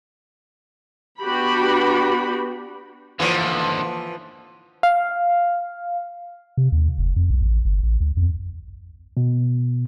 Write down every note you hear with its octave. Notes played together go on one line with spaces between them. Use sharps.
B3 D4 F#4 G4 B5
D#2 D3 E3 F3
F5
C3
D#2
F1
F2
B1
A1
G1
A1
D2
F2
B2